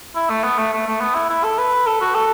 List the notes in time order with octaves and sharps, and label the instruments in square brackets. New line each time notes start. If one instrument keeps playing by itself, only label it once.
[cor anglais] E4
A3
B3
A3
A3
A3
B3
E4
E4
A4
B4
A4
F#4
A4